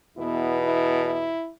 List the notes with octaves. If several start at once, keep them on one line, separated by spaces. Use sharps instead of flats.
E2 B2 B3 E4
E4
E4